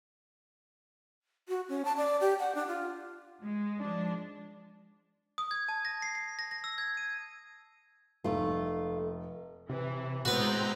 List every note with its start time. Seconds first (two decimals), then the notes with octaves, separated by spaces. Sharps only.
1.49 F#4
1.69 C#4
1.85 A5
1.97 D5
2.21 G4
2.39 F#5
2.55 D4
2.67 F4
3.43 G#3
3.79 F3 G#3 D4
5.38 D#6
5.51 G#6
5.69 A5
5.85 A#6
6.02 C7
6.15 C7
6.39 A#6
6.51 A#6
6.64 E6
6.78 G#6
6.97 D#7
8.24 F1 A3 F4
9.69 C3 E3
10.25 A2 G#3 B3 C4 F#4 B4 A#5 G6